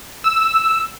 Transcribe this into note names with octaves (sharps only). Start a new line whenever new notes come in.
E6